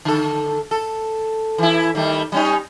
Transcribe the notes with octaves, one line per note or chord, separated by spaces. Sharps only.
D3 A4
A4
E3 E4
D#3 G3 A3
G3 C#4 D#4